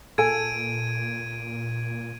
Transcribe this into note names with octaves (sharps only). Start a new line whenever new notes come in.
A#2 A4 G#5 G#6 D7 D#7